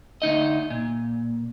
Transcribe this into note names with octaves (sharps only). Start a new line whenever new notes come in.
D2 D#4 D#5
A#2